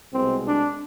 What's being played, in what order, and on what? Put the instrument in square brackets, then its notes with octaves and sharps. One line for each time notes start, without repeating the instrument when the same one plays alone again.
[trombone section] C2 B2 G#3 C4
D4